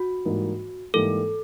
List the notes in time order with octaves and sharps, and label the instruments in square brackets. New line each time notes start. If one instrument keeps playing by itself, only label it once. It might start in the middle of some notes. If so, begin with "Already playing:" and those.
Already playing: [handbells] F#4
[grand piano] G#2 E3 G3 A#3 D#4
[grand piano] G#2 E3 G3 A#3 D#4 [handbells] A4